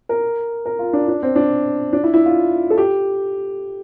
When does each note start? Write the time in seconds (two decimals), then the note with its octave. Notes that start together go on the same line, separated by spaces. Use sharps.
0.09 A#4
0.66 A#4
0.79 F4
0.93 D4
1.08 D4
1.23 C4
1.36 D4
1.93 D4
2.04 E4
2.14 E4
2.25 F4
2.70 A4
2.78 G4